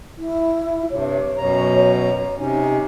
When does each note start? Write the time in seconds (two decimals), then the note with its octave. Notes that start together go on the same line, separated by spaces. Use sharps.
0.18 E4
0.91 G2 C3 C#5
1.38 F#2 B2 A#5
2.38 C3 C#4 D#4